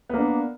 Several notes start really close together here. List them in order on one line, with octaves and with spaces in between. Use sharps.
B3 A#3 D4